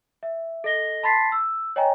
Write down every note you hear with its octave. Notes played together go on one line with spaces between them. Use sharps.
E5
A4 D#5 A#6 G7
A5 B5 C6 A6 B6 C7
E6
C#5 D#5 G5 G#5 A#5